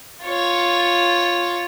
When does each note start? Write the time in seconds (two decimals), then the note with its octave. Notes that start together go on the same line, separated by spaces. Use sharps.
0.24 F4 C#5